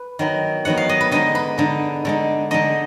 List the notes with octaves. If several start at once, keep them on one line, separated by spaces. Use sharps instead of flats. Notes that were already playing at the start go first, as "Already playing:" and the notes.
Already playing: B4
D#3 F#3 B3
D#3 F#3 B3 F#5
F5
D#5
B4
D3 G#3 D#4 D#5
B4
D3 G#3 D#4
D3 G#3 D#4
D3 G#3 D#4 D#5